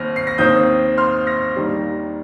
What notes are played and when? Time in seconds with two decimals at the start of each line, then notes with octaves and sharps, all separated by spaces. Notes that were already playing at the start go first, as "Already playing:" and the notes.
Already playing: D#2 D#3 C4 F6 A#6
0.16 C7
0.27 A#6
0.38 D#2 D#3 C4 D#6 G6
0.98 C6 F6
1.27 F6 A#6
1.56 D#2 D#3 G3